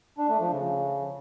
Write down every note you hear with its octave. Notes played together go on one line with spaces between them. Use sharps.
D4
A3
F3
C#3